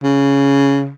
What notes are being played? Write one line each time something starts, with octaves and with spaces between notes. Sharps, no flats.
C#3